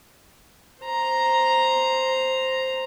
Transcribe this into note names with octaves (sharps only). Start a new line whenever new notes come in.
C5 A#5